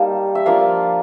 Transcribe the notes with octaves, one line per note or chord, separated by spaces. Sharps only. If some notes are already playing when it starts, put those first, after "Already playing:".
Already playing: G3 A#3 D#4 A5
E5
F3 A#3 D4 F4 F5